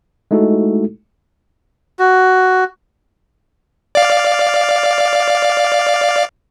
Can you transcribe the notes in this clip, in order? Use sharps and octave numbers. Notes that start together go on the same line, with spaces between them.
G#3 A3 D#4 E4 F#4 A4
F#4
D5 F5